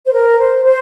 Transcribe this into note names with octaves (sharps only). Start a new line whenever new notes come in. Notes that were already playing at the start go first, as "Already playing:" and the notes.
C5
A#4
C5
C5